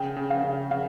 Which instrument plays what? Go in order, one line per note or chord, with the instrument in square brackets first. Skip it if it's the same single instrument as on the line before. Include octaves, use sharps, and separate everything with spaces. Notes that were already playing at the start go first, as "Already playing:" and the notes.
Already playing: [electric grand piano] C#3 [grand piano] G5
[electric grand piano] C#3
[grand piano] F5
[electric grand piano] C#3
[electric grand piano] C#3 [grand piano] F5